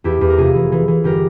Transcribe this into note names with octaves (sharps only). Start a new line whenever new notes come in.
E2 E4 G4
E2
A#4
F1 F4 G#4
E3
E3
E3
G1 G4 A#4